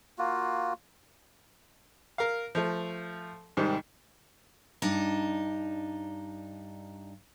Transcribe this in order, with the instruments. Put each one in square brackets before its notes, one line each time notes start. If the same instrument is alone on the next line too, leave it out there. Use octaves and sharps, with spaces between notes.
[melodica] A#3 F4 F#4
[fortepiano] A#4 F5
F3 A3
C2 G#2 D#3 G3 C4
[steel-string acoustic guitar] G2 D4 D#4